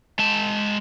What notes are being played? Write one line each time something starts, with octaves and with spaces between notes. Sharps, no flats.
G#3 A5